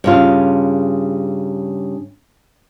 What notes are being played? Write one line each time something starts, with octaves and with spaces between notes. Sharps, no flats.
G2 C#3 F4